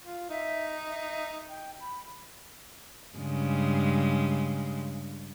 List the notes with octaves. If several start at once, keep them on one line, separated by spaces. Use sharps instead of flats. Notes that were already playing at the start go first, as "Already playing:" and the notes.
F4
D#4 E5
E5
G5
B5
G2 C#3 G#3